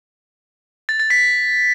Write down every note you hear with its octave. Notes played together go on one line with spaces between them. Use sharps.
A6
A6
B6